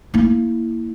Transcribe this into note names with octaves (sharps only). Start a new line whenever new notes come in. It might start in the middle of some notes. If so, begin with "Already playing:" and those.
A#3 E4